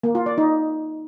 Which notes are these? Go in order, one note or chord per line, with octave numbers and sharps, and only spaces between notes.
A#3
F4
D5
D#4